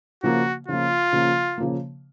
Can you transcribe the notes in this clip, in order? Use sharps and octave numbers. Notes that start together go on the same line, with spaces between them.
C#3 F3 A#3 F#4
C#3 F3 A#3 F4
C#3 F3 A#3
C#3 F3 A#3